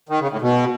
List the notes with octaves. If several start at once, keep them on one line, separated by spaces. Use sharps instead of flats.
D#3
C#3
A2
B2